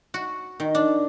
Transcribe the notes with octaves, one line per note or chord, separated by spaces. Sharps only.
F#4
D#3
D4